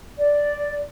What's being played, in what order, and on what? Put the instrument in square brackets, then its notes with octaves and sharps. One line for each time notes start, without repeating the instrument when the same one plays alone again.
[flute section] D5